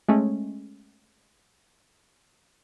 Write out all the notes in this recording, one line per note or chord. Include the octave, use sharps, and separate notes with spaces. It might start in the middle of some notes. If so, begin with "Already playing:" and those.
G#3 A3 C#4